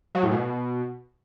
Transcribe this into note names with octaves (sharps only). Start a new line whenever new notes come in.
F#3
A2
B2